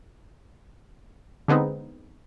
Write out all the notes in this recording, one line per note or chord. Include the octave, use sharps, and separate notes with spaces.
D3 G#3 B3 C4 D#4